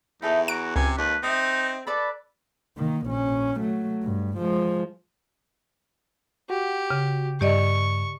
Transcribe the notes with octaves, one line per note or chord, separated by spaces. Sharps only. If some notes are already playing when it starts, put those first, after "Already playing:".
E2 D#4 E4 A4 E5
F#4 A#5 D7
C#2 C3 G#5
D#2 B4 F5 A5
C4 D#4 D#5 E5
A4 B4 D5 B5
D#3 A#3
A#1 C#4
F#3 A3
G2
F3 G#3
F#4 G4
C#3
G2 G4 D5 D#5 C#6